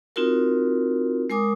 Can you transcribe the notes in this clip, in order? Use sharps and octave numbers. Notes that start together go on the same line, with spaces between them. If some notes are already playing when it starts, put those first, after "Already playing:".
C4 D#4 F4 F#4 A#4
G#3 A#4 G#5 D6 D#6